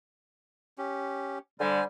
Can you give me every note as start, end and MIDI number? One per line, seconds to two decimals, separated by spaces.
0.78 1.39 61
0.78 1.39 67
1.60 1.80 50
1.60 1.80 55
1.60 1.84 72
1.60 1.84 80